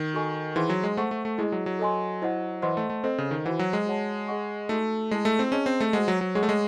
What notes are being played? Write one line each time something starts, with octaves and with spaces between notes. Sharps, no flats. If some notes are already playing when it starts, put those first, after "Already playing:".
Already playing: D#3
F#4 A4 D#5 G#5 C#6
E3 D#4 G#4 C5 F#5 C6
F#3
G#3
A3 C5 F#5 C#6
A3
A3
G#3 E4 G#4 D#5
F#3
F#3
A4 D#5 G#5 C6
E4 C5 D#5 F#5
E3 C5 D#5 F#5 C6
A3
A3
C4 A4 C5 D#5
C#3
D#3
E3 F#4 C5 F#5
F#3
G#3
F#4 C#5 F#5 A5
G#4 D#5 F#5 C#6
A3 D#4 F#4 A4
G#3 E4 G#4 D#5 A5
A3
C4
C#4 G#4 D#5 A5
C4
A3
G#3 F#4 C5 F#5
F#3
F#3
G#3 G#4 C#5 F#5 C#6
A3
G#3